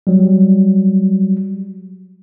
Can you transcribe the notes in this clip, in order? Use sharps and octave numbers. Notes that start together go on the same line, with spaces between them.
F#3 G3